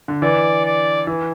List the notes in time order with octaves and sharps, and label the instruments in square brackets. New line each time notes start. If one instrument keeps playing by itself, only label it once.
[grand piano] D3
[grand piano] E3 [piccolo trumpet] D5
[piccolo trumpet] D5
[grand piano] E3